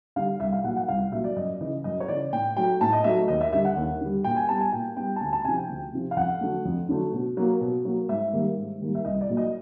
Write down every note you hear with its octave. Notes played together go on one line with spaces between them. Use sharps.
D3 G3 F5
C2 E5
F5
A#2 F#3 F#5
F#5
C2 F5
A#2 F#3 E5
D5
F#2 D#5
C#3 E3 D#5
F#2 D#5
C#5
C#3 E3 D5
A2 G5
F#3 A3 G5
A2 A5
D#5
F#3 A3 E5
D#2 D#5
E5
D3 G3 E5
F#5
D#2
D3 G3
A#2 G5
G#5
G3 B3 A5
G#5
A#2 G5
G3 B3 G5
A5
D2 G#5
A5
C3 F3 G#5
G5
D2
C3 F3
F5
F2 F#5
D3 F#3 A3
F2
D3 F#3 A3
B2
F#3 A#3
B2
F#3 A#3
G#2 E5
D#3 G3 A#3
G#2
D#3 G3 A#3
E5
C2 D#5
D5
A#2 F#3 A#3
D#5